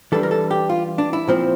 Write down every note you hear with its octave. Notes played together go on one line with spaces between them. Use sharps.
E3 G3 D4 A4
A#4
A4
G4
F4
D4
E4
A#2 F3 C4